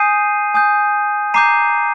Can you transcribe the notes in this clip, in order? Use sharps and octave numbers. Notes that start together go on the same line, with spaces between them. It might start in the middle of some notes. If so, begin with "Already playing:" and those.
Already playing: G#5 D#6 G6 C7 D#7
G#5 D#6 G6
A#5 D6 G6 C7 D#7